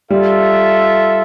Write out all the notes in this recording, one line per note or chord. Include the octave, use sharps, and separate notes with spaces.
G3 F4 A4 E5